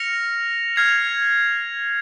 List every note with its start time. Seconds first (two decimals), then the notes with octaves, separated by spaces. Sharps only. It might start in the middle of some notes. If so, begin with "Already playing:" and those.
Already playing: F6 A#6 C#7 F7
0.76 F6 G#6 C7 F7